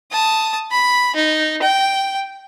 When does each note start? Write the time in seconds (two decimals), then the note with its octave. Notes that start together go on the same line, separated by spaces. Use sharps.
0.12 A5 D#6
0.71 B5
1.16 D#4
1.62 G5